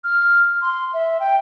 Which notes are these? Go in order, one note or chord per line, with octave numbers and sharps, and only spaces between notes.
F6
C6
E5
G5